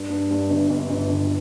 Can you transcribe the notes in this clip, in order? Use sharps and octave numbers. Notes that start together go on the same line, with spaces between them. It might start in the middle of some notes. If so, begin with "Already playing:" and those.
Already playing: G2
G2
G2
G1
G1
G1
G1